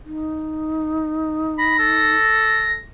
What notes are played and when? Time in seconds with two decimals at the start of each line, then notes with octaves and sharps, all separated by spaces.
0.05 D#4
1.58 B5 A#6
1.79 A4